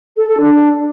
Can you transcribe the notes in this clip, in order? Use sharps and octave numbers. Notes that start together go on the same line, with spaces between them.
A4
A4
D4